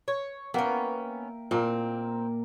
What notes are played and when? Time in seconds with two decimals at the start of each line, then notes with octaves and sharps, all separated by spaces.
0.08 C#5
0.54 A#3 B3 C#4 A#4 E5 G5
1.51 A#2 A#3 C4 A#4